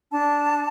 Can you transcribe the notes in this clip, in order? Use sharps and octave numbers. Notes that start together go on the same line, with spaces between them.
D4 A5